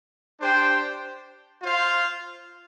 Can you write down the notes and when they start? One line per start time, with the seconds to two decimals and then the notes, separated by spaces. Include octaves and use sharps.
0.40 D4 G4 C5 G5
1.61 F4 C5 F5